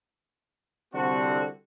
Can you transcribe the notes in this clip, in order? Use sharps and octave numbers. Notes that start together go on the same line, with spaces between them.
C2 D3 C4 F#4